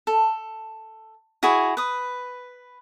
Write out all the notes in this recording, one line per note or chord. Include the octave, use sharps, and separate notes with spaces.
A4
E4 F#4 G#4 C#5
B4 D#6